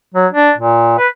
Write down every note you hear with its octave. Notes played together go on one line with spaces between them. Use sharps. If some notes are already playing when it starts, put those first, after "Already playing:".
F#3
D4
A#2
B4